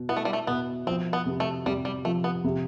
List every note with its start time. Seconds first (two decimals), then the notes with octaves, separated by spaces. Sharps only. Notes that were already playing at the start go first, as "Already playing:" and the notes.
Already playing: B2
0.09 B3 E4
0.17 A3
0.25 G3
0.33 A3
0.47 B2 B3
0.87 F3 C4
1.13 B3
1.26 C3
1.40 A3
1.66 C3 G3
1.85 G3
2.05 F3 A3
2.24 B3
2.44 C3